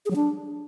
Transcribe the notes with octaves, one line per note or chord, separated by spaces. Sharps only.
G#4
F#3
D4